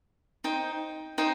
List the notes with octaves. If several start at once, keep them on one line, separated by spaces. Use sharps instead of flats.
D#4 C5 G5
D#4 C5 G5